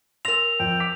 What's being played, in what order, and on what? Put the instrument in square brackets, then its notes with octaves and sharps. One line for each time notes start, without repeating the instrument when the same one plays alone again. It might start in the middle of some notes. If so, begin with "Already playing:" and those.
[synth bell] A#4 E6 [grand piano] C6 A#6 [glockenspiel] F7
[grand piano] F2 [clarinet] G5
[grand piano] D6 B6